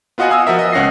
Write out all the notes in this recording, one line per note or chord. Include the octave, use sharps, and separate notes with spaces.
B3 F4 F#4 D#5 F#5 G#5
F5 G#5 D#6 E6
F3 F#4 A#4 E5
D#5
C#2 C#4 F#5 A#6 C7